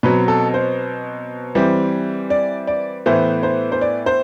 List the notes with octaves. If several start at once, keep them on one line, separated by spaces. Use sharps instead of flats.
B2 F#3 C4 B4
A4
C5
E3 G3 C4
D5
D5
A2 E3 B3 C5
C5
C5
D5
C5